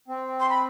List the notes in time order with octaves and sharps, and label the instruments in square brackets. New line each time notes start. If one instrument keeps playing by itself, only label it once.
[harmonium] C4
[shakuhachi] C6
B5